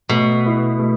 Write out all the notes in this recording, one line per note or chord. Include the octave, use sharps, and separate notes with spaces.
B2 A3
E4 B4
A3